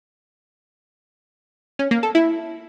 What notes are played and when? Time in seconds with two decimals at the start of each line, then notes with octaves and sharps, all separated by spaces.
1.79 C#4
1.91 A#3
2.03 A4
2.15 E4